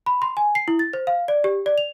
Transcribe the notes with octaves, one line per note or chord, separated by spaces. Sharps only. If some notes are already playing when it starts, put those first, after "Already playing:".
B5
C6
G#5
C7
E4
A6
C5
F5
D5
G4
D5
F7